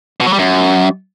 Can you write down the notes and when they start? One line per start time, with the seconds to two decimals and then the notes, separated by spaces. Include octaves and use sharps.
0.20 B2
0.27 F#3
0.33 G3
0.39 F#2